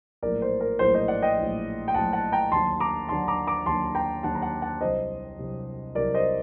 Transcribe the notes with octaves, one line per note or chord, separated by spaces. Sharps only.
A#1 A2 F#3 A#4 D5
C5
A#4
A#1 A2 F#3 C5
C5 D#5
D5 F#5
D#5 G5
A#1 A2 F#3
G5
A#1 A2 F#3 F#5 A5
F#5 A5
G5 A#5
D#2 D3 F#3 A5 C6
A#5 D6
D#2 D3 F#3 A5 C6
A#5 D6
A#5 D6
D#2 D3 F#3 A5 C6
G5 A#5
D#2 D3 F#3 F#5 A5
A#5
F#5 A5
F#5 A5
C2 C3 F#3 C5 D#5
C2 C3 F#3
C2 C3 F#3 A#4 D5
C5 D#5